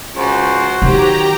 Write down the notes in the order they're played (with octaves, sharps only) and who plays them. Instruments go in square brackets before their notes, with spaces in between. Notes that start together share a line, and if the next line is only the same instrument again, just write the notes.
[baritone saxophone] C#2 [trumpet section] F#4 C5
[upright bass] D#3 [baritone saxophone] F#3 [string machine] G4 A#5